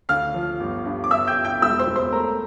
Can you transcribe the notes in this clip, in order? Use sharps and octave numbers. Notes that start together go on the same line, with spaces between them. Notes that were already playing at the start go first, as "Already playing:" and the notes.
D2 F5 F6
F3
G1
G2
D6
G1 E5 E6
G5 G6
G1
G5 G6
E1 E5 E6
C5 C6
E1
C5 C6
A3 A#4 A#5